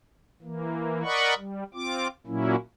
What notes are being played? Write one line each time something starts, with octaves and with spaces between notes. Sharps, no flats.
E3 A#3
A#4 D5 D#5 F#5 B5 C#6
G3
C4 F4 D6
A#2 F#3 A#3 C#4 E4